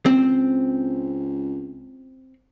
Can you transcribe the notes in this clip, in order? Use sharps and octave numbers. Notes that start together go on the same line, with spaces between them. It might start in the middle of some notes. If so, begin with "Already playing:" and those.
C#2 C4